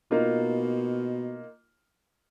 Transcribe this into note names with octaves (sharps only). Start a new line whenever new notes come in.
B2 A#3 D#4 F4